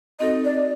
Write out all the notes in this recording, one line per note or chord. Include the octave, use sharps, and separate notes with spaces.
C4 D#4 F#4 A4 D#5
D5